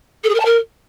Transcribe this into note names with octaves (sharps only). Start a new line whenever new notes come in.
A4
G#4
A#4
A5
A#4